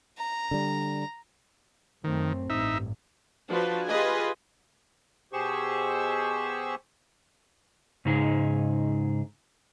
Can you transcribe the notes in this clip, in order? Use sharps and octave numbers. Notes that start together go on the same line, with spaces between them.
A#5
D3 G3
F#2 D#3 A3 C4
A1 G2 D#4 E5
F3 D4 F#4 B4
F4 G4 G#4 B4 D#5 G#5
B2 G4 G#4 C5 C#6 E6
G#2 C#3 D#4 G#4